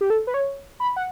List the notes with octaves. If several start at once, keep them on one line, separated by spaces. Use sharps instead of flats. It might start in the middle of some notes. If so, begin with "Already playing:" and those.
G4
A4
B4
C#5
B5
F#5